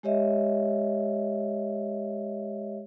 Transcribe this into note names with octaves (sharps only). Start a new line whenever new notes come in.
G#3 G4 C#5 D#5 E5